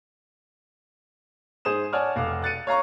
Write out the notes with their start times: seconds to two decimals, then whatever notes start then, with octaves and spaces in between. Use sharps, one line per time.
1.65 G#2 G#4 C5 D#6 E7
1.93 C#5 D5 F#5 G#5 A5 F6
2.16 F1 F5 F#5 D6
2.42 F#6 A6 C#7 D#7
2.67 C#5 F5 A#5 C#6